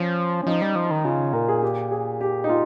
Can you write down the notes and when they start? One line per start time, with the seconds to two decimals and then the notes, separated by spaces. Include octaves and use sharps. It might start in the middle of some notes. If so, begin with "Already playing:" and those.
Already playing: F3 C#4
0.42 C#4
0.46 F3 D#4
0.62 G3
0.75 F3
0.85 D#4
0.91 D#3
1.05 C#3 F4
1.33 A#2 A#4
1.49 G#4
1.62 G4
1.91 G#4
2.21 G4
2.44 D#4
2.49 F4